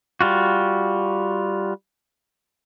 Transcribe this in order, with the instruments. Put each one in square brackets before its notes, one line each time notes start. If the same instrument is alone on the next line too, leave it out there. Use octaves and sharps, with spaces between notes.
[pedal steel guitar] G3 F4 F#4